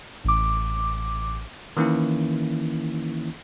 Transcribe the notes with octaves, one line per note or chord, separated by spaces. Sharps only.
A1 D6
D#3 E3 A#3 C#4 E4